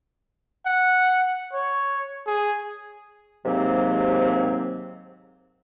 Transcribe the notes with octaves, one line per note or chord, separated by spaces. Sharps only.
F#5
C#5
G#4
D#2 G#2 C3 F#3 A#3 C4